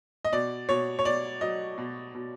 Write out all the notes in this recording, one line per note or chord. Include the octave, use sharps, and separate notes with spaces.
D#5
B2 D5
B2 C#5
C#5
B2 D5
F#3 D#5
B2
B2